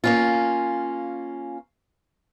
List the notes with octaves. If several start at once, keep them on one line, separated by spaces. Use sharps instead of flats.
A#3 C#4 F4